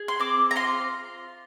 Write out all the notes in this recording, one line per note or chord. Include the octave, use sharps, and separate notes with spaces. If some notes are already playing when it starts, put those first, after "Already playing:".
Already playing: G#4
C6
C4 D6
A#5
F4 C6